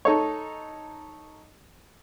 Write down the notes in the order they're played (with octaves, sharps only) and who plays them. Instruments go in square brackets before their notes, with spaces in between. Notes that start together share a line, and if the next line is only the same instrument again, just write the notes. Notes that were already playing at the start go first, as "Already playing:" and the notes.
[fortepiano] D#4 A4 C#5